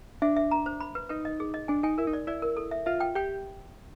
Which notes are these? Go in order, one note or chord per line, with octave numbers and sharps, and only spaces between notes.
D4 E5
E5
A#5
C5
B5
B4
D#4 B4
D#5
G#4
D#5
D4 G#5
D#4 G#5
E4 A#4
D#4
D5
E4 D5
A#4
A4
E5
F4 E5
G5
G4 G5